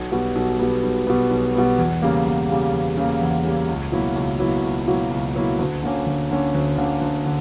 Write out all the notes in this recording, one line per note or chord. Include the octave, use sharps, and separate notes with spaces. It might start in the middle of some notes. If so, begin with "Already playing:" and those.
Already playing: B1
B2 G3 B3
B1
B2 G3 B3
B1
B2 G3 B3
B1
B2 G3 B3
E2
C#3 G3 A#3
E2
C#3 G3 A#3
E2
C#3 G3 A#3
E2
C#3 G3 A#3
C#2
B2 F#3 A#3 E4
C#2
B2 F#3 A#3 E4
C#2
B2 F#3 A#3 E4
C#2
B2 F#3 A#3 E4
D2
D3 A#3 C#4
D2
D3 A#3 C#4
D2
D3 A#3 C#4
D2
D3